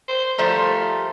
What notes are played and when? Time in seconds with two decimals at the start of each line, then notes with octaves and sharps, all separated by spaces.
0.08 C5
0.38 F3 G3 A3 A#4